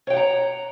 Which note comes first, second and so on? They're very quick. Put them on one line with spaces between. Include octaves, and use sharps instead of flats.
C#5 G5 F#5 A#5